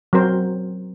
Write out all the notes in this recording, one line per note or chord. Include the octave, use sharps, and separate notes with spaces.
F#3 C4 A#4 C5